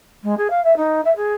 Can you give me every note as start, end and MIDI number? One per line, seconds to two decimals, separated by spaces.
0.23 0.34 56
0.37 0.47 68
0.50 0.63 77
0.64 0.76 76
0.76 1.01 63
1.04 1.12 76
1.16 1.33 68